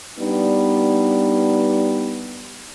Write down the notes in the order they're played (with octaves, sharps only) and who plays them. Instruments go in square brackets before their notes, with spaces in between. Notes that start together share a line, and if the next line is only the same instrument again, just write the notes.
[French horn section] G3 B3 D4 D#4